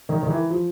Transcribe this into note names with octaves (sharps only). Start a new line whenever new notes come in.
D#3
D#3
E3
F3